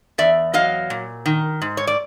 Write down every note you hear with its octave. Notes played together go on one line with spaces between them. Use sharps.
E2 D5 E5
F#3 D#5 F5
A#2
D#3
G#2
C#5
D5